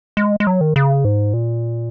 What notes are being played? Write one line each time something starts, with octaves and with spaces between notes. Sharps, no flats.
G#3
G#3
F#3
D#3
C#3
G#2
A#2